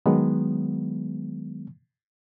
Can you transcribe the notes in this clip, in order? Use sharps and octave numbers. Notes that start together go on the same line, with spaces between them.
D#3 F#3 G#3 B3